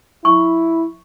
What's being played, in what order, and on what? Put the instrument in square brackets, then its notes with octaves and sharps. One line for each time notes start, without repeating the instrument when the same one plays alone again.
[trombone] E4 [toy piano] C#6